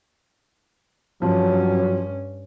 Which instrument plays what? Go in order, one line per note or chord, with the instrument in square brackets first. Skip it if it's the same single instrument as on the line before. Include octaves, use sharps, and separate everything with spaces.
[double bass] G2 C#4 [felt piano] F3 [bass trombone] F#3